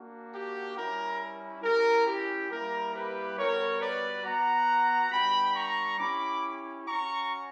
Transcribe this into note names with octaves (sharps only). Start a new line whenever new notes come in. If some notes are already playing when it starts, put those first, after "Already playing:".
Already playing: A#3 D4 F#4
G4
G3 C#4 E4 A#4
C#4 E4 G4 A#4
G4
G3 A#3 E4 A#4
G4 B4
G3 B3 F#4 A#4 C#5
B4 D5
B3 F#4 F#5 A#5
G3 B3 D4 G5 B5
A#5 C#6
C#4 E4 G4 B5 D6
C#4 F#4 A#5 C#6